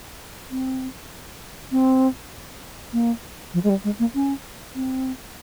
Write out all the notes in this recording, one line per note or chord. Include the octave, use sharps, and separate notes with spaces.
C4
C4
A#3
F3
G#3
G3
G#3
A#3
C#4
C4